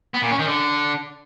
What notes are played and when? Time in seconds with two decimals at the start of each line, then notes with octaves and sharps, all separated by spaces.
0.14 B3
0.22 A#2
0.31 C#4
0.39 D#3
0.47 D3